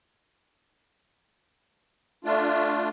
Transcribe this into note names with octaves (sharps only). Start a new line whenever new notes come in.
A3 D4 F4